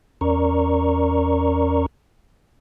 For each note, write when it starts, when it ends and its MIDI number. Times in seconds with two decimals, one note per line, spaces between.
0.21 1.86 40
0.21 1.86 61
0.21 1.86 70
0.21 1.86 74
0.21 1.86 82
0.21 1.86 85